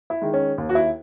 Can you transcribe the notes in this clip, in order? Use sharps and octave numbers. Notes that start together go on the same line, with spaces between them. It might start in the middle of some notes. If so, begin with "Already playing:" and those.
E4
D#3 G#3
C#4
D#2
F#4
E4